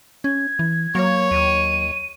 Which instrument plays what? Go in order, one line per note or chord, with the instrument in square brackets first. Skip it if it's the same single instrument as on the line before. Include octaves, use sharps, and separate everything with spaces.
[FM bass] C#4 [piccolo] G#6
[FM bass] E3
[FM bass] F#3 [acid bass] A#3 [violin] C#5
[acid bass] D#2 [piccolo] D#7